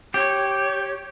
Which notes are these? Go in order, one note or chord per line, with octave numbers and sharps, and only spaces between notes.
G4 C#5